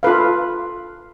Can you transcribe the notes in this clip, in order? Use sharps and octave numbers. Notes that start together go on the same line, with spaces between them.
F4 A4 B4 F5